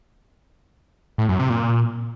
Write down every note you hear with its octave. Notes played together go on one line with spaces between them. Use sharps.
A2
F#2
C3
A#2